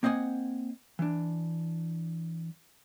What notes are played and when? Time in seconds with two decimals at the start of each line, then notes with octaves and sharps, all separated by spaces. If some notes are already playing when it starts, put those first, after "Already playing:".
0.03 A#3 C4 D#5 F#5 G#5
0.99 E3 D4